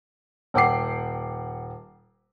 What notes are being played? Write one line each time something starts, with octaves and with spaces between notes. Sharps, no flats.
D#1 F#5 G5 D6 C7